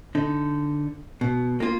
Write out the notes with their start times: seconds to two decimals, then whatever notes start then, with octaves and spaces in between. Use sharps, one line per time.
0.15 D3 D#4
1.21 B2
1.60 A#3 F4